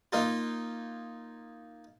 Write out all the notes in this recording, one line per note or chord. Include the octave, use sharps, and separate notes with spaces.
A#3 D#4 F4